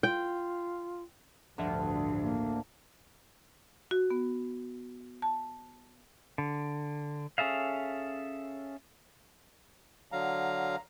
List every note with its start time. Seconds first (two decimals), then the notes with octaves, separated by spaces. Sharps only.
0.03 F4 G5
1.58 A1 D2 G2 D3 F3 E5
2.20 A#3
3.91 F#4
4.11 B3
5.22 A5
6.38 D3
7.38 C#4 G#4 A4 E5 F5
10.12 D3 F#3 F5 A#5